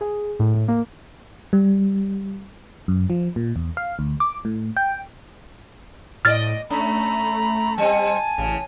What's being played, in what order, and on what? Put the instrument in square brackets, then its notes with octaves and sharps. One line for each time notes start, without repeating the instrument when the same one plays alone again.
[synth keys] G#4
A2
A2
A#3
[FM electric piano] G3
F#2
F3
A#2
E2
F5
D2
D6
A2
G5
[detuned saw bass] A2 [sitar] F#3 D5 D#5 [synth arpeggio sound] F6 A6
[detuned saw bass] A3 [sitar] C#4 [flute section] A#5 B5
[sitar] G3 C4 [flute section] G#5 A5
[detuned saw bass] A1 [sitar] C#3